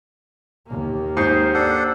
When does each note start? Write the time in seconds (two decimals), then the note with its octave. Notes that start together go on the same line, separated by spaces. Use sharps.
0.67 D#2 A#3
1.17 G#2 C5
1.54 D4 A4 F#5